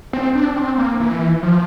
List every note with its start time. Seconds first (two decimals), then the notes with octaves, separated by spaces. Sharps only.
0.13 C4
0.35 D4
0.56 C4
0.78 A#3
1.00 E3
1.43 F3